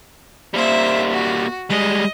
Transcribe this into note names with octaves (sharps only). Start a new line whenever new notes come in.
G3 A#3 C5 E5
F#4
G3 G#3 D#5